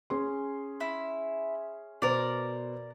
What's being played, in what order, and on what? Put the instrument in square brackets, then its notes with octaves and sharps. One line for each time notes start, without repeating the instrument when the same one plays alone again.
[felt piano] C#4 G#4 C6
[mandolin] E4
[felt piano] B2 C5 [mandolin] A#4 D5